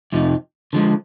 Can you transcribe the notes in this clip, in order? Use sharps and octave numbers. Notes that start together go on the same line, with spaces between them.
F2 C3 F3 D#4
D3 F3 G#3